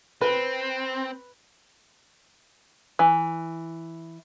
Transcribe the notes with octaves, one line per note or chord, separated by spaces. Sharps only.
C4 B4
E3